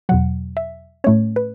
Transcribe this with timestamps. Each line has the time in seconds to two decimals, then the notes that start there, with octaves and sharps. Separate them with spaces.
0.09 E2 B2 F#3 F#5
0.57 E5
1.04 A2 A3 C#4 C#5
1.36 B4